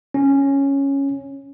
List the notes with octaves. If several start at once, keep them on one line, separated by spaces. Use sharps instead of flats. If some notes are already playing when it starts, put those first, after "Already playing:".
C#4